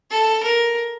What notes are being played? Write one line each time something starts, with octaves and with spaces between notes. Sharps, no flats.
A4
A#4